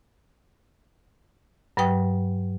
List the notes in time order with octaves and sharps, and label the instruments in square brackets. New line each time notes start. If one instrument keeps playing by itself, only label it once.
[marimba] G2 F#3 B4 G5 D#6